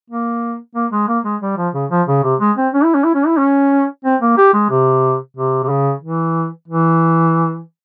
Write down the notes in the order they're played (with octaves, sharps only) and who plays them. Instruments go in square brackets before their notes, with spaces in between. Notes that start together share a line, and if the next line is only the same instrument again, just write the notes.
[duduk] A#3
A#3
G#3
A#3
G#3
G3
F3
C#3
F3
C#3
C3
G#3
C4
C#4
E4
C#4
E4
C#4
E4
C#4
C4
A#3
G4
G#3
C3
C3
C3
C#3
E3
E3